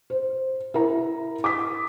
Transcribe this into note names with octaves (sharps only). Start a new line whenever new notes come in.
C5
E4 A#4 A#5
D6 D#6 B6